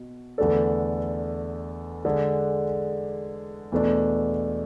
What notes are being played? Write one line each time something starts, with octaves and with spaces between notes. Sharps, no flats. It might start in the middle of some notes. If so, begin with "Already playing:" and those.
Already playing: B2
E2 D3 A3 D4 A4
D3 G#3 D4 G#4
E2 B2 A3 D4